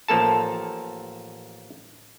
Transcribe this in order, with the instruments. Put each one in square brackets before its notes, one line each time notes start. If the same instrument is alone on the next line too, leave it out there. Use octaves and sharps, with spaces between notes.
[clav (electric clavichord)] A1 F3 A#3 A4 A5